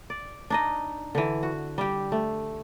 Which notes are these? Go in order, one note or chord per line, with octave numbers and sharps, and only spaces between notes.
D5
D4 D#4 D#5
D3 E3
F#4
G3 G4
A3